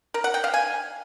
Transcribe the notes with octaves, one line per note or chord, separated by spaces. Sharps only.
A#4
F#5
G5
F5
G#5